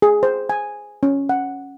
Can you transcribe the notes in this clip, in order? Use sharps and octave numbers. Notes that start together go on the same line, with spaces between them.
G#4
C5
G#5
C#4
F#5